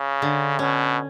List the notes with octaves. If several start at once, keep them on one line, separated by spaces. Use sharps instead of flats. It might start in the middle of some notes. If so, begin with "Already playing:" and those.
Already playing: C#3
D3
B2 C#4